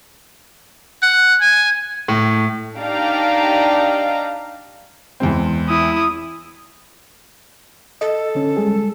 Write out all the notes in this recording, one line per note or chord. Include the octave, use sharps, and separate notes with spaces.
F#5
G#5
A2
D4 D#4 G4 D5 F5 A#5
E2 G#3 C4
E4 D#6
A4 D#5
D3 C#4
G3 G#3 G#4